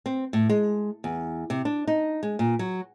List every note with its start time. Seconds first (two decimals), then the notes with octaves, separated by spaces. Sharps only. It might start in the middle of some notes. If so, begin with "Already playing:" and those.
0.06 C4
0.33 A2
0.49 G#3
1.04 E2
1.50 C3
1.65 D4
1.87 D#4
2.23 G#3
2.39 A#2
2.59 F#3